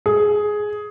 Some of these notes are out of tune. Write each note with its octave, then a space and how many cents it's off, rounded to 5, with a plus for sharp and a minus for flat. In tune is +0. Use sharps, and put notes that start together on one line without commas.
G#4 +10